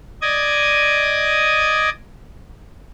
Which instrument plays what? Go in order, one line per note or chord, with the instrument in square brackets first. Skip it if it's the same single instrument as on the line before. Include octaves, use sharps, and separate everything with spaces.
[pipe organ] D5 D#5 D#6 G#6